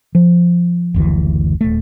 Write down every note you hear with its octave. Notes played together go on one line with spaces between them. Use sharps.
F3
F#1 D2 E3
D#1 A3